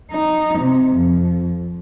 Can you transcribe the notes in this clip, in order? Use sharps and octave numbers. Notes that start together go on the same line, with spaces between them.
D#4
C3
F2